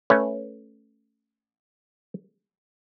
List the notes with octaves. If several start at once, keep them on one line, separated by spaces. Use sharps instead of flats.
A3 C#4 B4 C#5